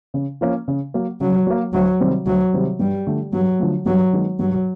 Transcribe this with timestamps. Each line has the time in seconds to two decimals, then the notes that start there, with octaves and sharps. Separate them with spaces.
0.14 C#3
0.41 F3 A#3 C#4
0.68 C#3
0.94 F#3 A#3
1.20 C#3 F#3
1.47 F#3 A#3
1.73 D2 F#3
2.00 C3 D#3 G3 C4
2.26 D2 F#3
2.53 C3 D#3 G3 C4
2.79 G2 G3
3.07 D3 F3 A3
3.33 G2 F#3
3.59 D3 F3 A3
3.86 G2 F#3
4.13 D#3 G#3 B3 D#4
4.39 G2 F#3